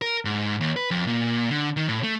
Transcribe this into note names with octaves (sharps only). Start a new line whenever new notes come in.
A#4
G#2
D#2
B4
F2
A#2
D3
D#3
A2
A3